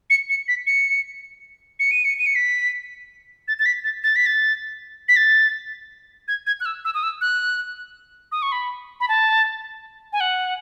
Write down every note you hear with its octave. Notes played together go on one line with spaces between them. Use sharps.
C#7
C#7
B6
C#7
C#7
D#7
C#7
D#7
C#7
B6
A6
A6
B6
A6
A6
B6
A6
B6
A6
G#6
G#6
F#6
E6
E6
D#6
E6
F#6
D#6
C#6
B5
B5
A5
G#5
F#5